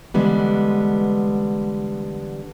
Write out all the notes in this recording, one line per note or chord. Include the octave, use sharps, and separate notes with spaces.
D3 E3 G3 G#3 B3